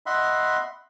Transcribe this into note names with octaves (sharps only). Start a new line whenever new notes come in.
D#5 E5 F#5 B5 C6